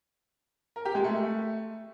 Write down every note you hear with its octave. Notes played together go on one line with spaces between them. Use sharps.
A#4
G4
G#3
A3